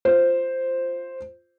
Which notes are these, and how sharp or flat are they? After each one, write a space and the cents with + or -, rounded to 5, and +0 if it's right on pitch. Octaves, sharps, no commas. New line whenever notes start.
F4 +0 C5 +0